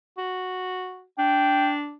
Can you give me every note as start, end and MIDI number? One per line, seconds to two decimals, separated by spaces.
0.18 1.04 66
1.19 1.95 62
1.19 1.72 79